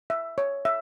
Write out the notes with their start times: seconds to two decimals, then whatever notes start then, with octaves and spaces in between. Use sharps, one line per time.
0.10 E5
0.38 C#5
0.65 E5